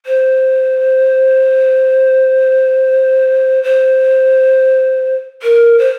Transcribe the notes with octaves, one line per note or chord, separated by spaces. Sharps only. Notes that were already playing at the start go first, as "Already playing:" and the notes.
C5
C5
A#4
C5